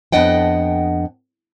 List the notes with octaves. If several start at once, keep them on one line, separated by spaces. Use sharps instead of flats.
F2 B3 D4 D#5 F#5 G5